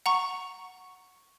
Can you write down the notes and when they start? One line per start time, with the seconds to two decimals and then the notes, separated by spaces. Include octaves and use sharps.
0.06 F#5 A#5 C#6